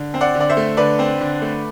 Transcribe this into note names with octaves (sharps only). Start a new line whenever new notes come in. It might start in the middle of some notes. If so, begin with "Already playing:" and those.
Already playing: D3
C4
D5 F#5
D3
D5
C5 E5
A3
D3 B4 D5
C4
D3
A3